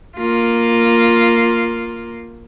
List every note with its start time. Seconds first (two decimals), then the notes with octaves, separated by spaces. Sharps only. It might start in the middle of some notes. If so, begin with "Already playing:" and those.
0.18 A#3 F4